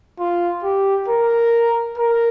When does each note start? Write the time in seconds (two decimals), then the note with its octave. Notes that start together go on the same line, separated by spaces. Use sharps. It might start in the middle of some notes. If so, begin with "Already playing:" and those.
0.20 F4
0.63 G4
1.08 A#4
1.98 A#4